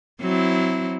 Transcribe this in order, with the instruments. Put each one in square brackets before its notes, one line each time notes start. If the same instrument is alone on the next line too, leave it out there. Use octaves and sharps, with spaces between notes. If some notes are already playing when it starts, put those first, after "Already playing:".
[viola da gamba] F#3 C4 E4